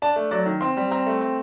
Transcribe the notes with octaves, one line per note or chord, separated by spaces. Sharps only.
D4 A5
A3
F#3 D5
D#3
C4 C6
G3
C4 A#5
A3
C4